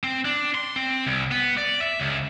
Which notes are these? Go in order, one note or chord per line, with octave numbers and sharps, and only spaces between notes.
C4
D4
C6
C4
C2
B3
D5
E5
C#2